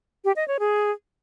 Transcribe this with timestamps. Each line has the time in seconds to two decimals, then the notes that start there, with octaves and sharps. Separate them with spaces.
0.25 G4
0.36 D#5
0.48 C#5
0.59 G#4